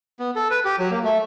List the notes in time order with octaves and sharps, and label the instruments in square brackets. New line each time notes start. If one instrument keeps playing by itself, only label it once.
[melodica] B3
A4
B4
G4
F#3
A#3
A3